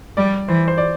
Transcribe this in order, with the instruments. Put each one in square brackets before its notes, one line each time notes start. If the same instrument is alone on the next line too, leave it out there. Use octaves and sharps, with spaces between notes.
[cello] G3 [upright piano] D5
[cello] E3 [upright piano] C5
[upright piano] C5
D5